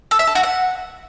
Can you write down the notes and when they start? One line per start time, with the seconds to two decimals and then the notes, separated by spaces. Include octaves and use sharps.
0.11 A4
0.19 E5
0.27 A4
0.35 F#4
0.43 F#5